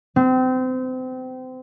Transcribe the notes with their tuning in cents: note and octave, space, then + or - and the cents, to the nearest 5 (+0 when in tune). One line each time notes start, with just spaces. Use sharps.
C4 -30